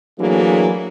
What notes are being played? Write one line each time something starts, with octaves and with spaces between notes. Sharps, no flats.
E3 F#3 A3 A#3 D4 G#4